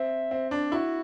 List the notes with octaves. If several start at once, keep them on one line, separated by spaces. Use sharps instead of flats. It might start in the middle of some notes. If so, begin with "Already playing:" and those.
Already playing: C4 E5
C4
D4
E4 F#4